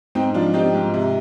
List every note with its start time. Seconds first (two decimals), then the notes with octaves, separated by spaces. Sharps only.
0.15 G#2 C4 D#4
0.34 F3 D4 F4
0.54 C4 D#4 G4
0.74 G#2
0.94 C3